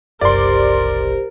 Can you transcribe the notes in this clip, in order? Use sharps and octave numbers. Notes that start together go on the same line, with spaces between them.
F#1 C2 G4 A#4 C5 D5 C6